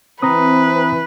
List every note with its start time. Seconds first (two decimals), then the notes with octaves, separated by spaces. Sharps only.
0.22 E3 C4 B4 A#5 B5 D#6